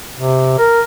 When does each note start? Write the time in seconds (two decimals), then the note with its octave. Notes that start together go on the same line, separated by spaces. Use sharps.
0.16 C3
0.58 A#4